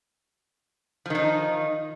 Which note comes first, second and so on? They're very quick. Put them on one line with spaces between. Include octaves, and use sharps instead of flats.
F3 D#3 D#4